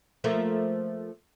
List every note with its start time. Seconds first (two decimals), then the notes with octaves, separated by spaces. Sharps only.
0.24 F3 A3 A#3